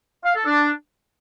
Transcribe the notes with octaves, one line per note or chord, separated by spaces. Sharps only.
F5
A4
D4